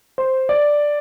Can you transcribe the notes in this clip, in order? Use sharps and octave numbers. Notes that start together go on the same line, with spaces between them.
C5
D5